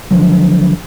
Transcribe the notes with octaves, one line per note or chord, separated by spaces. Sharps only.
D3 F3 F#3